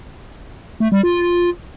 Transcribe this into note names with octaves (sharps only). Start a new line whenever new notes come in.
A3
G3
F4